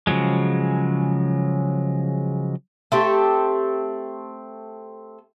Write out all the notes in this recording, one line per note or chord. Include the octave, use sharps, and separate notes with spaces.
C#3 F3 F#3 G#3
A3 C4 G4